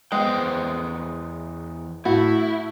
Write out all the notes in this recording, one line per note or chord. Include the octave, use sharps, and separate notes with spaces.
E2 G#3 B3 C5 G5
A2 E4 F#4